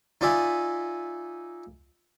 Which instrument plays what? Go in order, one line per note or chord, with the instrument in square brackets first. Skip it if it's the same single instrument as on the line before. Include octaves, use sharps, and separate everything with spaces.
[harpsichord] D#4 F4 D5 E5 G#5